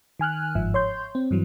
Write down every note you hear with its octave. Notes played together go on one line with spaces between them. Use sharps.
D#3 G#5 F6 F#6
G1 G#2 F3 E5
C#5 C6 G6
C4
G2 E3 F#3